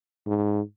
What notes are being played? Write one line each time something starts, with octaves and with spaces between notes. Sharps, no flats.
G#2